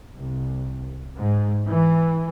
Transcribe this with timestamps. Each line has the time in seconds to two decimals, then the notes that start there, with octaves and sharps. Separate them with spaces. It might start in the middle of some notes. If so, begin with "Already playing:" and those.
0.15 C2
1.18 G#2
1.67 E3